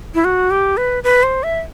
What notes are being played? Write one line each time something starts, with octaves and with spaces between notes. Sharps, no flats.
E4
F#4
G4
B4
B4
C5
E5